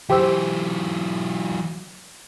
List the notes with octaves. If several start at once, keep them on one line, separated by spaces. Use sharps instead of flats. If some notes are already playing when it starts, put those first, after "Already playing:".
E3 F#3 G4 C5 E6